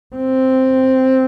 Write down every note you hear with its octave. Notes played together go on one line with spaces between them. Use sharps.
C4